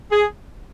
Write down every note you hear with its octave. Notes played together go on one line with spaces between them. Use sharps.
G#4